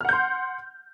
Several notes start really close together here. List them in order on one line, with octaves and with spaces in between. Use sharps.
F6 F#5 G6 C6